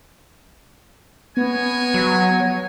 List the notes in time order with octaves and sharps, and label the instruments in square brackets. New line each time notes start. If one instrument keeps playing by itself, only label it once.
[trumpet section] G#3 C#5 G#5 [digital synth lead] B3
[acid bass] F#3